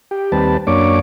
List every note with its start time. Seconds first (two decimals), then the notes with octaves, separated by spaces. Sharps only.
0.11 G4
0.32 D#2 G3 C4 B4 A5
0.67 F#2 A#3 D4 C#5 D6